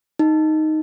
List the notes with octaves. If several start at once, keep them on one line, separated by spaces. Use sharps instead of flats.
D#4